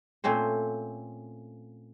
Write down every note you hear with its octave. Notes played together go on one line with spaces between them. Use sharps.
A#2 A3 C4 C#4 C5